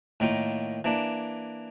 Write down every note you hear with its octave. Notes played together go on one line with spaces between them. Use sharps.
A2 D#3 A#3 F4
E3 A#3 D4